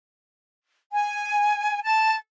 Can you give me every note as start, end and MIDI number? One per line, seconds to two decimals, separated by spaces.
0.92 1.82 80
1.83 2.16 81